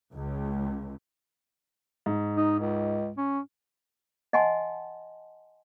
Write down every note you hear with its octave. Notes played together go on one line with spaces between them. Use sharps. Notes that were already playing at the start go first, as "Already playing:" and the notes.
C#2
G#2
D#4
C#2
C#4
D#5 F#5 G#5 A5 C6